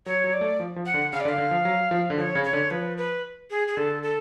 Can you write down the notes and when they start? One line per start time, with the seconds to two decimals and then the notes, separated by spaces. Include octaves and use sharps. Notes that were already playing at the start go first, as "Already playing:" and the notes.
0.06 F#3 C#5
0.24 F#3
0.33 D5
0.41 A3
0.60 F3
0.76 F3
0.86 F#5
0.94 D3
1.12 C#3 F5
1.20 D5
1.25 D3
1.29 F5
1.38 D3
1.51 F3
1.65 F#3
1.91 F3
2.10 D3
2.18 F3 C#5
2.35 C#3
2.44 C#5
2.53 D3
2.70 F3 B4
2.97 B4
3.50 G#4
3.68 G#4
3.77 D3 A4
4.03 A4